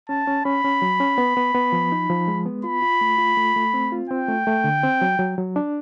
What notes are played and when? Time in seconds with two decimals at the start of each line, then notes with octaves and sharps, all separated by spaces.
0.09 C#4 A5
0.27 C#4
0.45 C#4 B5
0.64 C#4
0.82 F#3
1.00 C#4
1.18 B3
1.37 B3
1.54 B3
1.72 F3
1.92 D#4
2.10 F3
2.28 G#3
2.46 B3
2.64 F4 B5
2.82 F4
3.01 A3
3.18 F4
3.37 A3
3.56 A3
3.74 C4
3.92 F4
4.09 C4 G5
4.29 A3
4.47 A3
4.64 D3
4.83 C4
5.02 F#3
5.19 F#3
5.38 F#3
5.56 D4